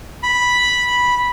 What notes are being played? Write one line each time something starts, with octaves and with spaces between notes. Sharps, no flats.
B5